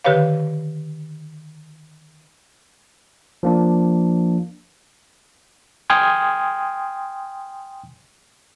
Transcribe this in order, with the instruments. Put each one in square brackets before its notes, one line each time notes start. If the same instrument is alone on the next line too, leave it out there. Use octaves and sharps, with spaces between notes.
[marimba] D3 D#3 G4 B4 C#5 F5
[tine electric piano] F3 A#3 D4
[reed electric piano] G5 G#5 C6 D#6 F6 G#6